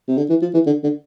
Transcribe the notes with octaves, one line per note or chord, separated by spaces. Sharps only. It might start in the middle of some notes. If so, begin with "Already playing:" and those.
C3
D3
E3
F3
E3
D3
D3